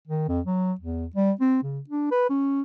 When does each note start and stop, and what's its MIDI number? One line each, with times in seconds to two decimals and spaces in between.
0.07 0.25 51
0.28 0.40 41
0.46 0.72 54
0.80 1.06 40
1.15 1.32 55
1.40 1.61 60
1.63 1.80 49
1.89 2.10 62
2.11 2.26 71
2.29 2.61 61